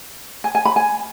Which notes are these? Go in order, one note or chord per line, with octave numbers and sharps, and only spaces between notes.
G#5
G#5
B5
G#5